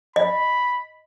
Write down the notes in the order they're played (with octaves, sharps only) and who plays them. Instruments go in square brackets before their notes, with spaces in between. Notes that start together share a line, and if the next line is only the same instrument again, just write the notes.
[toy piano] D#5 [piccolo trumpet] B5